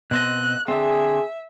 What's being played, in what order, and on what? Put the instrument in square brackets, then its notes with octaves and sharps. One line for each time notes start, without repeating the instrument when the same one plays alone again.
[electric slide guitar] B2 C4 D#5 [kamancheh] F#6
[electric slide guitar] D3 C4 [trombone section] G#4 [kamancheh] E5